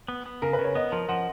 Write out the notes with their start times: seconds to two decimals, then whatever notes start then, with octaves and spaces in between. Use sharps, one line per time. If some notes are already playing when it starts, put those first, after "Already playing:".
0.08 B3
0.26 B3
0.42 C#3 A#4
0.53 B4
0.59 C#3
0.64 C#5
0.75 B3 D#5
0.92 F3 A#4
1.09 F3 F#5